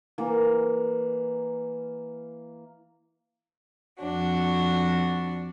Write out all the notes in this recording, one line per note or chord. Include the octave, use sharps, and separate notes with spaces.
E3 A#3
F2 D4 F#4